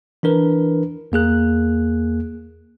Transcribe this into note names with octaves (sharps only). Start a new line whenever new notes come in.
E3 D4 A#4 B4
E2 A#3 G#4 F#6